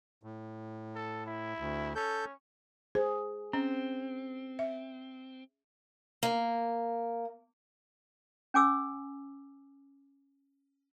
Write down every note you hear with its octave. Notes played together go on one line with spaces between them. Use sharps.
A2
A4
E4
D2
C#4 A4 G6
G#4 C5
C4 C#4
E5
A#3
C#4 G#5 D6 E6